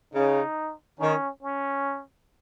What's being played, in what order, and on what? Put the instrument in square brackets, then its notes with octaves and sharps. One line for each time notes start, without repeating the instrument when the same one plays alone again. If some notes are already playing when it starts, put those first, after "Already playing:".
[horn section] C#3 [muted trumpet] D#4
[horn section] D#3 [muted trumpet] C#4
[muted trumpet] C#4